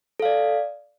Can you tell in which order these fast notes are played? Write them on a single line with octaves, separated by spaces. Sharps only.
A4 F5 D5